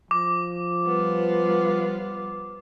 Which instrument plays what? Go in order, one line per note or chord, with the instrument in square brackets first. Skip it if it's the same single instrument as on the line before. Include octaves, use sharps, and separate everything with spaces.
[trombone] F3 [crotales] D6
[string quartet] G3 B3 F4